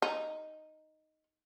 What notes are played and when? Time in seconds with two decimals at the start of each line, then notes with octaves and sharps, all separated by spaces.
0.02 D#4